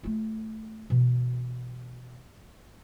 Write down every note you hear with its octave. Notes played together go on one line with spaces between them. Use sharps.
A3 F4
B2 E3